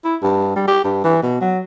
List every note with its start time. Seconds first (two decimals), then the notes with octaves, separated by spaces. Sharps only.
0.04 E4
0.22 G2
0.56 G3
0.68 G4
0.84 G2
1.04 E3
1.23 B2
1.41 F#3